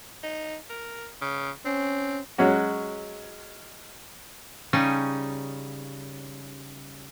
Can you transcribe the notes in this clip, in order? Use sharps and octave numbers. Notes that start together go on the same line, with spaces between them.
D#4
A#4
C#3
C4 C#4
F#3 G#3 C#4 F#4
C#3 G3 C#4 D#4